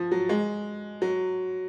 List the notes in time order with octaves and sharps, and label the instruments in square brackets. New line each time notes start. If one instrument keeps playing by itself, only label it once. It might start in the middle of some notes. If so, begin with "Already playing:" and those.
Already playing: [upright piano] F3
F#3
G#3
F#3